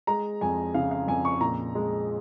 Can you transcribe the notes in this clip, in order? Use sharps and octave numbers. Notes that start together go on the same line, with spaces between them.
G#3 A#5
F2 G#5
C#3 F5
F5
F2 G#5
C#6
A#2 A#5
G#3